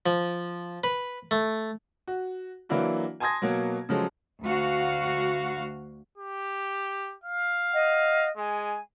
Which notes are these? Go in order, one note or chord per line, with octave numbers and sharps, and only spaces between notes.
F3
B4
A3
F#4
E3 F#3 A#3 D4 E4 F#4
G#5 A5 C6 D#6 G#6 A#6
B2 F#3 A#3
C#3 F3 F#3 G#3 A3
D2 F#4 F5
G4
F5
D#5 F#5
G#3 G#5